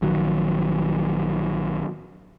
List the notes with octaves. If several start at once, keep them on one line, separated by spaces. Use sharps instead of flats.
A#1 D#3 F#3